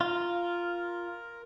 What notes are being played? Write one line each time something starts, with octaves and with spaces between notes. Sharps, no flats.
F4 A#4